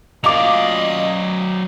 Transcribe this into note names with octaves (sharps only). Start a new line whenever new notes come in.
F#3 A#3 C#4 F4 D5 D#5 D6 F7